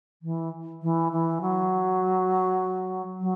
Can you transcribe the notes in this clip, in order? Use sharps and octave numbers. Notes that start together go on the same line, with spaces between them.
E3
E3
E3
F#3
F#3